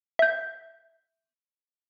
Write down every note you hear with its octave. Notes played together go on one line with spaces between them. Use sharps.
E5 G6